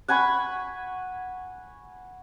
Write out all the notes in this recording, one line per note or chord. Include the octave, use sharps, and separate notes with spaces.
F#5 G#5 B5 C#6